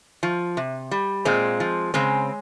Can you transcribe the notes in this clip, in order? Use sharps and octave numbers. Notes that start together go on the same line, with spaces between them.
F3
C3
G3
A#2 G#3 C4
F3
C#3 G#3 C4